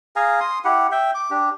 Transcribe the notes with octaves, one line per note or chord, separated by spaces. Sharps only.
G#4 F5 G#5 A#5
C6 D#6
E4 G4 F#5
E5 G5
D6
D4 G4